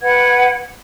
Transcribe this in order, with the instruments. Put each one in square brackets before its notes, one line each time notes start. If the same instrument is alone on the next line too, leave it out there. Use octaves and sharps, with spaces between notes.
[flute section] B4 F#5 G5 G#6